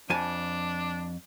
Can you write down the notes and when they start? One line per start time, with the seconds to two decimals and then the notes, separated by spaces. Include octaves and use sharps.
0.10 F2 D4 G#5 A5